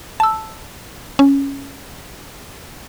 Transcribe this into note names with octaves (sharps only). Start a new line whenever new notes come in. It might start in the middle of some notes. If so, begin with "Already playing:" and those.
A5 E6
C#4